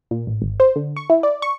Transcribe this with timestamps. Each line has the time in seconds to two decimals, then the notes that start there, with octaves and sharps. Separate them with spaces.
0.11 A#2
0.27 A1
0.42 G#1
0.60 C5
0.76 D3
0.97 C#6
1.10 E4
1.23 D5
1.42 C#6